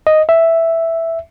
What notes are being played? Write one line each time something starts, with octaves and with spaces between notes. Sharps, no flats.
D#5
E5